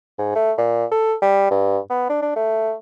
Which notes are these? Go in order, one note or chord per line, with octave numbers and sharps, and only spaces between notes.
G#2
A3
A#2
A4
G3
G2
B3
D4
D4
A3